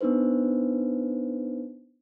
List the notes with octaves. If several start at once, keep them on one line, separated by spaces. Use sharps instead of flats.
B3 D4 D#4 B4 C5